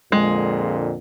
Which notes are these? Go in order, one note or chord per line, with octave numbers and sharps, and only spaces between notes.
F2 A#2 D3 G#3